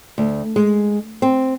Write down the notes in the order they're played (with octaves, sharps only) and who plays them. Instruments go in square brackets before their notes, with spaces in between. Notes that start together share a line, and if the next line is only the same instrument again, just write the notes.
[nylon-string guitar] D2
G#3
C4